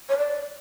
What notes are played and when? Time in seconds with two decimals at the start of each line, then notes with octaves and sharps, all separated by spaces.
0.09 C#5
0.18 D5